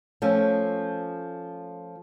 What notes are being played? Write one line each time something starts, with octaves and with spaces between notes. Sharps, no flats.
F3 A3 C#4